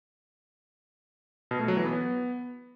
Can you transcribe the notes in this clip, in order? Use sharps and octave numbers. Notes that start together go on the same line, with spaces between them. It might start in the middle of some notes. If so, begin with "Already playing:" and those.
B2
A3
F#3
E3
B3